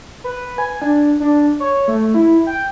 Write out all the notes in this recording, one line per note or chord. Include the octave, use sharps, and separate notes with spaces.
B4
G#5
D4
D4
C#5
A3
E4
G5